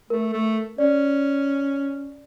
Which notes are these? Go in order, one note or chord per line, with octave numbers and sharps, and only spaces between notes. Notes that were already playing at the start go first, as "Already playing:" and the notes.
A3 A#4
A3
C#4 D5